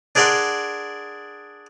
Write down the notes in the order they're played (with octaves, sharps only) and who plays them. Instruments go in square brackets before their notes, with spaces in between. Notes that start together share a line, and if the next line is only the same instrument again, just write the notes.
[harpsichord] D4 G#4 A#4 D5 F#5 C6